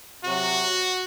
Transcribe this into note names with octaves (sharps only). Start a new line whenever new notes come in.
C3 F#3 F#4